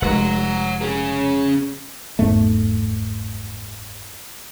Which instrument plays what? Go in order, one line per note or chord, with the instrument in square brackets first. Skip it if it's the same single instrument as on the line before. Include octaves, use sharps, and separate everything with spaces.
[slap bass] F1 G#3 [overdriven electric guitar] F#5 A#5
[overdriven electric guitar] C#4 G#4
[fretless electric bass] F#1 E2 G#2 A3